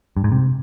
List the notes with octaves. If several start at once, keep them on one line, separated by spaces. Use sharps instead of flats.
G2
G#2
C3